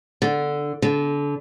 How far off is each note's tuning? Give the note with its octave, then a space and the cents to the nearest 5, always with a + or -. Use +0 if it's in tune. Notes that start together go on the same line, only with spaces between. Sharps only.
D3 +0
D3 -30